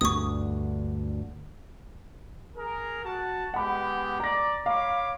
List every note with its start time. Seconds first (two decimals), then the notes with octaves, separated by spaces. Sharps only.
0.01 D2 G2 D3 C#6 D#6
2.55 G#4 A#4
3.02 F#4 F#5 A5
3.54 G#3 B3 G4 F#5 B5
4.20 D5 A#5 A#6
4.66 C#5 F5 B5 D6